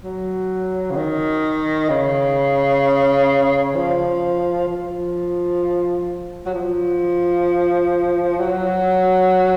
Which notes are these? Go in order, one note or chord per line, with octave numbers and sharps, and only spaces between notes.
F#3
C#3
D#3
C#3
F3
F3
F#3
F3
F#3